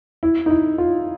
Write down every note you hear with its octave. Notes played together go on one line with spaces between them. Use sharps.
E4
D#4
E4
F4